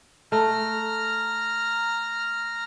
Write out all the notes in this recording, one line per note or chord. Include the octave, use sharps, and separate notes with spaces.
A3 A#5 F6